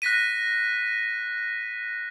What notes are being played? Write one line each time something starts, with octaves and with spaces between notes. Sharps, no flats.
F#6 A#6 B6 D#7